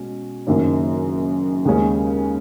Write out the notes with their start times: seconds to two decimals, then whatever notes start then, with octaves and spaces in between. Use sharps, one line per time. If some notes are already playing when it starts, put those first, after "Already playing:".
Already playing: B2 G#3 C#4
0.47 F#1 F#2 D#3 A#3 C#4
1.65 D#2 C#3 G#3 C#4